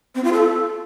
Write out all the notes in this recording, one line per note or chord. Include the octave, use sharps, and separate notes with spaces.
C4
F4
A4